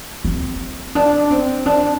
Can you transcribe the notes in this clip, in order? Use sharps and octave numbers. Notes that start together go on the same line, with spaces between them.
C4
D4
C4
D4